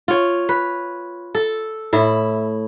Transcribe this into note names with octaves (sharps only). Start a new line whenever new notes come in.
F4 C#5
B4
A4
A2 E4